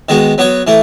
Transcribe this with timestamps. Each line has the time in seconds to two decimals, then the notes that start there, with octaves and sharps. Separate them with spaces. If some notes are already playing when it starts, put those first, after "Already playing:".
0.09 D#3 G#3 B3 F#4
0.38 F#3 B3 F#4 C#5
0.67 E3 A3 E4